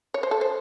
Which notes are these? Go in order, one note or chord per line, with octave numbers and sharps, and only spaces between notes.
C#5
C5
A4
C5